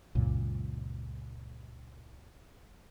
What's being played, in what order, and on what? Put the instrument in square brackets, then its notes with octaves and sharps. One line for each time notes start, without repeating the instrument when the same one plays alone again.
[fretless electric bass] C#2 F#2 A#2 C#3